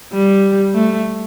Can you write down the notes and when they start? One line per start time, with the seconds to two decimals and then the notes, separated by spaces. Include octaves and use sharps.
0.13 G3
0.74 A3